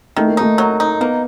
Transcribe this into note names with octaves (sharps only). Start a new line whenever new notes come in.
D#3 A3
A#3
A3 D#4
F#3
D#4
A#3 B3